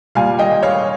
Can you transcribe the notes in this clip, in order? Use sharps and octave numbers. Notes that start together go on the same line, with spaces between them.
A#2 G3 F5 G#5
D#5 G5
C#5 F5